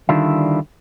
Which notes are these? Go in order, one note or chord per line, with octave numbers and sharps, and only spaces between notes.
D3 D#3 G3 D4 E4 F4